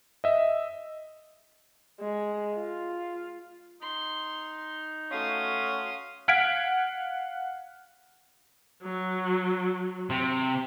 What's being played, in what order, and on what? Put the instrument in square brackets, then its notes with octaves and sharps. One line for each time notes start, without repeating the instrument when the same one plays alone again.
[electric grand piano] D#5 E5
[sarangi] G#3
F4
[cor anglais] D#4 [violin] C6
[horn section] A3 C#4 F#4 [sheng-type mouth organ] F5 C6 [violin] D#6
[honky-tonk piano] F5 F#5 F6 G#6 B6 D7
[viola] F#3
[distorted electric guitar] C3